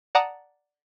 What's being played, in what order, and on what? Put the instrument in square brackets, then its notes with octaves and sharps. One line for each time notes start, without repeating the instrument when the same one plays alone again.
[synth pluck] D5 F#5 A5 A#5 D#6